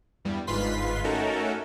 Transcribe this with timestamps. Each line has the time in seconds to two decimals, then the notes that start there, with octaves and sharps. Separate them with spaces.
0.25 E2 G2 G3
0.47 G1 G#2 F4 B4 C6 B6
1.04 A3 C#4 D#4 F#4 A4 A#4